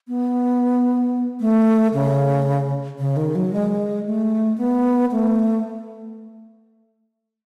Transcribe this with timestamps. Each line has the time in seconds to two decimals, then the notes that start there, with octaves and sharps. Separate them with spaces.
0.08 B3
1.40 A3
1.94 C#3
2.99 C#3
3.17 D#3
3.35 F#3
3.53 G#3
4.06 A3
4.58 B3
5.11 A3